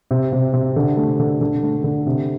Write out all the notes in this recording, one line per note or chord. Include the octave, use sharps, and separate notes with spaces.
C3
C3
C3
D3
A3
D3
D3
A3
D3
C3